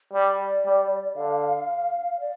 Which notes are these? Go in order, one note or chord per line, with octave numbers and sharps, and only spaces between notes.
G3 D5
G3
D3 F5
D5